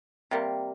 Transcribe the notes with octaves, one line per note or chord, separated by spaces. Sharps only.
C3 G3 A#3